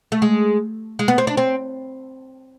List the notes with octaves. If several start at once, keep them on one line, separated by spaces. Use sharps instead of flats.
A3
G#3
G#3
B3
C4
D4
C4